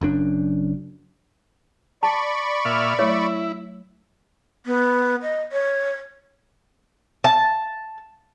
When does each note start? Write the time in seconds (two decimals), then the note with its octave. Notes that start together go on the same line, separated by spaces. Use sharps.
0.01 F#1 F#2 D4
2.03 D5 A5 B5 C#6
2.65 A#2 E5 F6
2.99 F#3 A3 E4 C#5 E5
4.66 B3
5.22 D#5
5.52 C#5
7.24 A5